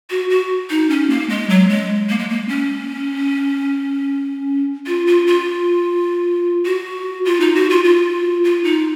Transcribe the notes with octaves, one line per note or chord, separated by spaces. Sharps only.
F#4
F#4
D#4
C#4
A#3
G#3
F#3
G#3
A#3
G#3
A#3
C#4
F4
F4
F4
F#4
F4
D#4
F#4
F4
F4
F4
D#4